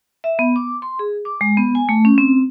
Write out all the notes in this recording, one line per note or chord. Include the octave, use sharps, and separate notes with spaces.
E5
B3
D6
C6
G#4
D6
G#3
B3
G#5
A3
C#4
C4